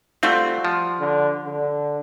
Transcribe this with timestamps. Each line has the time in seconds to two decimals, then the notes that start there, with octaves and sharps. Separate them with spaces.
0.23 G3 A3 C4 F4 F#4
0.65 F3
1.00 D3
1.46 D3